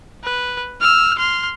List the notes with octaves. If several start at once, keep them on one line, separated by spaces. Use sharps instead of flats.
B4
E6 F6
C6 F6